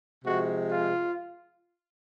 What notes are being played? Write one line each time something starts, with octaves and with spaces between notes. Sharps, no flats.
C3 F3 G#3 F#4
F4